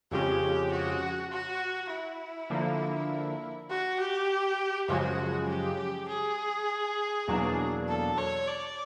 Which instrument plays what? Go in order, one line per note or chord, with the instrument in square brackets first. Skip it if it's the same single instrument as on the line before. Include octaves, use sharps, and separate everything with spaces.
[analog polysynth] F2 C#3 F3 G#3 C#4 [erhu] G4
[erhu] F#4
F#4
E4
[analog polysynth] D3 F3 A#3
[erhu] F#4
G4
[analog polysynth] F#2 C#3 F3 G#3 [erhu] F#4
[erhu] G4
G#4
[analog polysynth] E2 B2 F#3 A#3 D4
[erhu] A4
C#5
D5